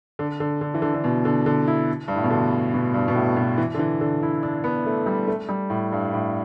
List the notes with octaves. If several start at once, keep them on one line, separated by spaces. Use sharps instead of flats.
D3
D3
D3
E3
D3
D3
B2
D3
D3
E4
G2
A2
B2
D3
B2
G2
B2
A2
B2
E3
D3
E3
D3
E4
D4
B3
A3
G3
A3
G3
A2
G2
A2